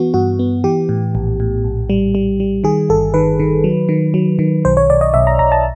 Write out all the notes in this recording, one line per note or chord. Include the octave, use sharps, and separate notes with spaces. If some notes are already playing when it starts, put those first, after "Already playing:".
Already playing: E3 B3 F#4
G2 F#4
B3
E3 G4
A2
A#1
A2
A#1
G3
G3
G3
D#3 G#4
G1 A4
D#3 B4
D#3
F#3
D#3
F#3
D#3
B1 C5
C#5
B1 D5
D#5
B1 E5
A#5
B1 A#5
A5